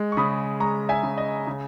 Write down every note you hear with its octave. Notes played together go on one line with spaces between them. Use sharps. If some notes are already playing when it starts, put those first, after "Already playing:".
Already playing: G#3
C#6
C#3 B5 D#6
G#3 A#5 C#6
E5 G#5
C#3
D#5
C#3